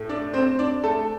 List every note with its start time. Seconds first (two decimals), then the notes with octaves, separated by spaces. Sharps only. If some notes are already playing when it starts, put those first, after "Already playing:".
Already playing: A2 A3
0.09 D4 D5
0.34 C4 C5
0.59 D4 D5
0.84 A3 A4